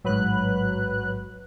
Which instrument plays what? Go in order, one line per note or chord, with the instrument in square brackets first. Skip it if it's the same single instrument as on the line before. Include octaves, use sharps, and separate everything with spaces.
[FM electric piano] A1 G#2 [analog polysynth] F#3 B4 F#6